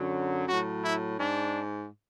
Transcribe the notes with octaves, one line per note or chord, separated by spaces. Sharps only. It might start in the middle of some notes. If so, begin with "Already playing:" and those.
Already playing: F#2 D3 F#3
A2 F#3 F#4
E4
G#2 D4